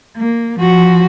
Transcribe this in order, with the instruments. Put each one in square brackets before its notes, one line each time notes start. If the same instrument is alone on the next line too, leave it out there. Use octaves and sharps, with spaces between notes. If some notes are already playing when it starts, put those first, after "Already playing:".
[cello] A#3
F3 F#4